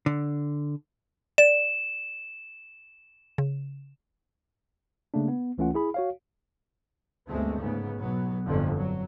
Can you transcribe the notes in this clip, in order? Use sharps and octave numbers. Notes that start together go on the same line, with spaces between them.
D3
D5 E7
C#3
C#3 A3 A#3 D4
B3
C#2 E3 A3 C#4 F4 F#5
E4 G#4 B5
F#4 C#5 F5
G1 D2 G#3 A3 C4
G#2 C#3 B3
B1 F#3 B3
G1 F2 A2 D3 F3
F#3